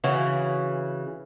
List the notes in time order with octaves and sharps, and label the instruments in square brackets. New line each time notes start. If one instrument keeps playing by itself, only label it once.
[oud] C#3 E3 F#4